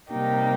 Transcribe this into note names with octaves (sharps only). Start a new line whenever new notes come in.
C3 G3 A#3 D#4 G4